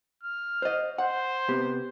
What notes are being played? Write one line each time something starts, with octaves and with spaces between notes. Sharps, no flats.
F6
C5 D#5
C5 F#5
C3 B3 G4